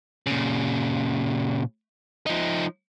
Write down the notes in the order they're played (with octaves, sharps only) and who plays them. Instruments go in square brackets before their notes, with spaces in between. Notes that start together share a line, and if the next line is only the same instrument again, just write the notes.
[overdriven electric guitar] A#2 C#3
F3 D#4